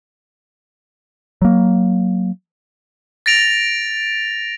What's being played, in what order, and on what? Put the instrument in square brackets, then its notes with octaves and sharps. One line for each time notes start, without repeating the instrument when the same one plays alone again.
[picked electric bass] F#3 A#3
[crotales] A6 A#6 D7 F7